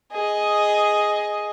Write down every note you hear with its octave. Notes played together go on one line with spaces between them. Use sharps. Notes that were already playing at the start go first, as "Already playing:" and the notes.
G#4 D#5